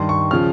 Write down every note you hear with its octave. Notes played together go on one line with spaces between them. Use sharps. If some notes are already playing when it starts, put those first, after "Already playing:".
Already playing: G2 D#3 C6
C#6
C#3 F3 F6